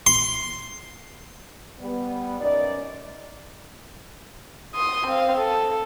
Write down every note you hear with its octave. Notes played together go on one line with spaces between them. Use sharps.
C6
G3 B3
F#2 D#4 D5
C6 D#6
C4 F5
A4